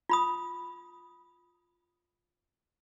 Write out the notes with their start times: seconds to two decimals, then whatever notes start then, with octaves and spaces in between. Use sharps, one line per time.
0.09 F4 B5 D#6